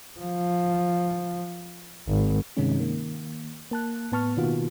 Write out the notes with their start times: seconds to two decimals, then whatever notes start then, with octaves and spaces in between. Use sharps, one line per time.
0.20 F3
2.08 G#1
2.57 G2 C3 D#3 G#3 C#4 D#4
2.79 D#3 A#3
3.71 A#3 A5 F#6
4.12 A2 B3 A5 C#6 F6
4.37 B2 D#3 A#3 B3 F4 F#4